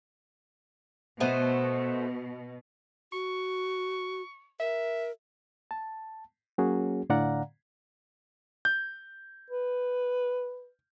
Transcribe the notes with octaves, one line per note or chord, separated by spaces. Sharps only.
B2 A3 B3 C5
F#4 C#6
A#4 E5
A5
F#3 A#3 C#4 F#4 G#4
A2 D3 D5 F5 F#5 A#5
G6
B4